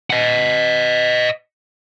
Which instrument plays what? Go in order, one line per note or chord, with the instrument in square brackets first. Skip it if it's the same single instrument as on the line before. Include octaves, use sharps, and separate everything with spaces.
[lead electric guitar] D#5 F#5